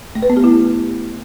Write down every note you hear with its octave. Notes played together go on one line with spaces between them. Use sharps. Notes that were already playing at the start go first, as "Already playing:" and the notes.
A3
B4
B3
G4
E4